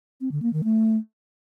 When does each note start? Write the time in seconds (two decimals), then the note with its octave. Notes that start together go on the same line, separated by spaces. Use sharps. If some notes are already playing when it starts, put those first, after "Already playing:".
0.21 C4
0.32 D3
0.42 A#3
0.53 D#3
0.64 A3